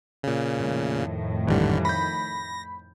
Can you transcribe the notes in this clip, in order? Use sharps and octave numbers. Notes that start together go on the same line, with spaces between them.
A#2 C#3
F2 A2 D#3
G#1 D3 E3 G3
B5 G6 A#6